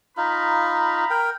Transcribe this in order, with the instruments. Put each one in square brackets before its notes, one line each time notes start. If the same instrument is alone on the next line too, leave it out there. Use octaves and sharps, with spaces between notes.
[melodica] D#4 F4 [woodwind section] A#5 B5
[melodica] A#4 G5